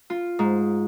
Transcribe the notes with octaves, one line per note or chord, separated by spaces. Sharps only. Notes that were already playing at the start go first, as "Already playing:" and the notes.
F4
G#2